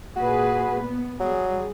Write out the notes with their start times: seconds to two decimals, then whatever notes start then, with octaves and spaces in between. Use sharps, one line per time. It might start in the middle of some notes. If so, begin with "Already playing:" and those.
0.16 A#2 F#4 G#4 B4
0.83 B3
1.20 F#3 G3 G#4